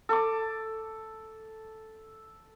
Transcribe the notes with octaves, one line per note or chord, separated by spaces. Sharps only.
A4 D6